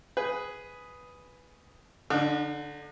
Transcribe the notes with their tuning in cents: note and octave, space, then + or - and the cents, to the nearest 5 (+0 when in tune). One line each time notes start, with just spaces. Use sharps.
G#4 +0 B4 +0
D3 -10 D#4 -45